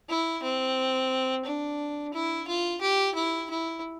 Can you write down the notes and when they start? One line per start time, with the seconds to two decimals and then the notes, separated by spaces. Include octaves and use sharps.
0.09 E4
0.43 C4
1.45 D4
2.14 E4
2.48 F4
2.81 G4
3.15 E4
3.50 E4